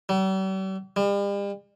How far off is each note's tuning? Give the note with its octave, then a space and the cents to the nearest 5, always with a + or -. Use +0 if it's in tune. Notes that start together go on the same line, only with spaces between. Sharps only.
G3 -45
G3 +40